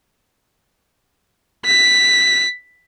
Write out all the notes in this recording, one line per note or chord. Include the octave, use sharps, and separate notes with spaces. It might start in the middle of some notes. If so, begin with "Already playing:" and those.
B6